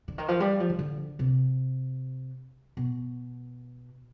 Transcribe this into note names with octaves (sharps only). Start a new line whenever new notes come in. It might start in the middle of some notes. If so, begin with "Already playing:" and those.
D3
D#3
F3
G3
F3
D#3
D3
C3
B2